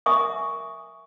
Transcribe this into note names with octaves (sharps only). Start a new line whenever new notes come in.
A#4 E5 G#5 C#6 D#6